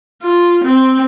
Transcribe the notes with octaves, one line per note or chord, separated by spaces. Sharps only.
F4
C4